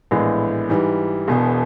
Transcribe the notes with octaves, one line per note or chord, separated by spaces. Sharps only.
A#1 A2 E3 G#3 B3
G#2 E3 G3
E1 E2 B2